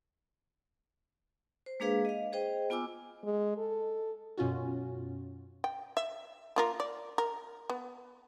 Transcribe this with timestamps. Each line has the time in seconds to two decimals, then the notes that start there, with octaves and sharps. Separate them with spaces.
1.66 C5
1.80 G#3 A#3 D4 G#4 B4 F5
2.05 D#5 F5
2.33 G#4 C5 D#5 G5
2.70 B3 F4 G#5 D6 E6
3.24 G#3
3.58 A4
4.38 F#2 B2 C#4 F4 F#4
5.64 G5
5.97 E5
6.56 A#3 F4 A#4
6.80 D5
7.18 A#4
7.70 B3